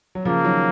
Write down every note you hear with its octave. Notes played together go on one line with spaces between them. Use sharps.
F#3
C#3 F3 A#3
D#3 F#3